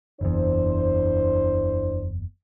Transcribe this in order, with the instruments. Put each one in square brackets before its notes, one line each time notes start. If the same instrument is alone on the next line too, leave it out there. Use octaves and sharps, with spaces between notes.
[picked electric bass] F#1 E2 [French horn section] D4 E4 C5